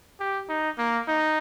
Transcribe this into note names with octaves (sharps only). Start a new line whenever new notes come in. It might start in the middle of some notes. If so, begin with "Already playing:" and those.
G4
D#4
A#3
D#4